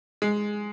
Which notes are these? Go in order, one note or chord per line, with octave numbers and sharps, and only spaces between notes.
G#3